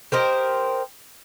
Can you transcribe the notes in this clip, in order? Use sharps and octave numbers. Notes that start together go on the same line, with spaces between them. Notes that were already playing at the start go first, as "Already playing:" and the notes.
G4 A#4 C5 D#5